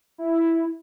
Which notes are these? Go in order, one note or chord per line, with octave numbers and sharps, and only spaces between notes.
E4